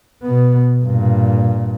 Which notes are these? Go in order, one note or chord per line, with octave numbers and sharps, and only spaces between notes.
B2 B3
G2 A#2